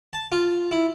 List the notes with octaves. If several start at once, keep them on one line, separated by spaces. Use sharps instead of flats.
A5
F4
E4